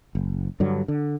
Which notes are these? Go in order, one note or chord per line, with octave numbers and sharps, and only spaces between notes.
F#1
G2 D3 F#3
D3